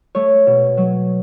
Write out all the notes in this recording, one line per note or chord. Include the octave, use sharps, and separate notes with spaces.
A3 C#5
B2
F#3